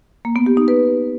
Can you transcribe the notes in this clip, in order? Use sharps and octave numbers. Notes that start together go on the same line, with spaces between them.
A#3
B3
G4
D#4
B4